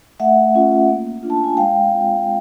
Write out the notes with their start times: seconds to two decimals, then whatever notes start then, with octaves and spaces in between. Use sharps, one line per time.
0.20 A3 E5 F#5
0.55 C#4 F4
0.88 A#3
1.23 D4 F4
1.30 A5
1.44 G#5
1.57 G#3 F5 G5
1.92 C4 F4